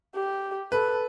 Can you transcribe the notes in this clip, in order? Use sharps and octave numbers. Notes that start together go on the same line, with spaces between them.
G4
A4 B4